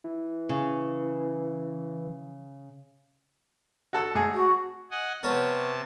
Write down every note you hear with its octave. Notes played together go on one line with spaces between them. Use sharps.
E3
C#3
F#4 A4 E6
G#1 A2 G#4
F#4
D#5 F#5 G#5
C3 B3 A#4 C#5 A5